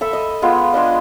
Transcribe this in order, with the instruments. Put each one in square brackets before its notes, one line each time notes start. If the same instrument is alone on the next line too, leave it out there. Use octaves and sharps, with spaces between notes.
[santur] A4 E5 B5
D#5
G#3 B3 F4
G#3 D4 D#5